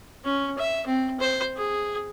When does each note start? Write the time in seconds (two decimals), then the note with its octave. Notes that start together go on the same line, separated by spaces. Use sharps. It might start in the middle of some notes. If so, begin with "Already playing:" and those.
0.24 C#4
0.58 E5
0.86 C4
1.20 C5
1.57 G#4